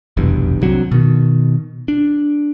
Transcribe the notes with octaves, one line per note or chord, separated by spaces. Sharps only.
F1 B1 E2 G2
C2 D3 F#3 C4
B2 D#3
D4